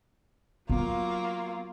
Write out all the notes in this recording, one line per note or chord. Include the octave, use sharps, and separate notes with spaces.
F#3 A#3 B3 F4